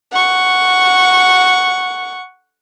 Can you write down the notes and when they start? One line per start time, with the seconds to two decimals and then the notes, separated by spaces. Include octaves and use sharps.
0.12 F#5 C#6